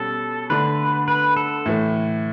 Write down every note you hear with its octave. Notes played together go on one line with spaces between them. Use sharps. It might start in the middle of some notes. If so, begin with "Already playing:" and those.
Already playing: B2 G3 C#4 A4
D3 A3 D4 B4
B4
A4
A2 E3 A3